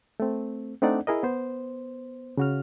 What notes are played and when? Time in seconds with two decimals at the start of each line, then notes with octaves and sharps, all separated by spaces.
0.20 A3 C4
0.82 A3 C4 D4 D#4 D5 F#5
1.07 E4 G#4 A#4 D#5
1.23 B3 C5
2.37 C#3 F#4 F6